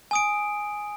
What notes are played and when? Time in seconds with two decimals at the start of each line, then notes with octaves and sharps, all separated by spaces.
0.11 G#5 D#6 D7